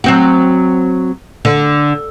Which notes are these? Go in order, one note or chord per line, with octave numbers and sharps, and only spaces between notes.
F#3 C4 F#4
D3